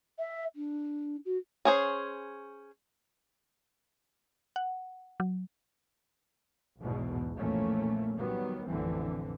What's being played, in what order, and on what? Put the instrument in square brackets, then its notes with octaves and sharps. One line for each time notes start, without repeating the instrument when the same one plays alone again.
[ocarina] E5
D4
F#4
[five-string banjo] C#4 G#4 C5
[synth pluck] F#5
F#3
[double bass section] B1 E2 G#2 B2
F2 A#2 E3 A3 A#3 C#4
D#3 F#3 G3 B3
A1 F2 D3 E3 C4